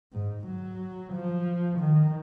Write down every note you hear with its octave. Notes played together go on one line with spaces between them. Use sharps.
G#2
F#3
F3
D#3